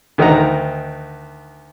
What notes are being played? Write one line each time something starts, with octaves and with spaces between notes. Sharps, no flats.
D2 D#3 D#5 F#5 A#5